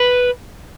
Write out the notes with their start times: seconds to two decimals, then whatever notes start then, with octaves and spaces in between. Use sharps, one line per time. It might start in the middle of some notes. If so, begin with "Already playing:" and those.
Already playing: B4